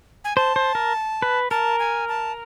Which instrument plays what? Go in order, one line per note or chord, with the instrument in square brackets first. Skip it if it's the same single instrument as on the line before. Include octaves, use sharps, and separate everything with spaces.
[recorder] G#5
[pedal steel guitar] C5 [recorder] A5
[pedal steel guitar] C5
A#4
B4
[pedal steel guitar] A#4 [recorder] A5
[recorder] G#5
A5